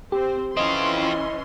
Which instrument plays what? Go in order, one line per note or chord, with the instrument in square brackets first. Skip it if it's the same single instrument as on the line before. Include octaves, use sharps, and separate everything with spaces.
[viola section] C4 C5 [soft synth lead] G4
[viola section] E3 C#4 C6 [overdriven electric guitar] C4 F4 [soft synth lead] D#5